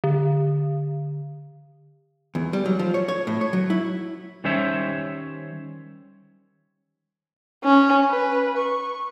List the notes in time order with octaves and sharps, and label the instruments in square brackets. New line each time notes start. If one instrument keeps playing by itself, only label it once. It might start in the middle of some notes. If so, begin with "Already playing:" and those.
[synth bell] D3
[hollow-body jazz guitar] E2
G3
F#3
F3
C#5
C#5
A2
C#5
F#3
E4
[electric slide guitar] D#3 G3 C#4 C5 C#5 E5
[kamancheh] C#4
B4
C#6